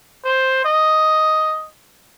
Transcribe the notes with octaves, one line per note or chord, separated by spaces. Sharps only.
C5
D#5